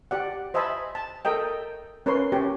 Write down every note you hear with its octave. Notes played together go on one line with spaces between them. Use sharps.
G4 D5 F#5
C5 D#5 E5 G#5 A5 B5
A5
A4 A#4 D#5 G5
C#4 A#4 B4 C#5 C6
C#4 G4